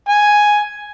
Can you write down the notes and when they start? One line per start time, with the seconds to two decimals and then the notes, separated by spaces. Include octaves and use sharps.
0.09 G#5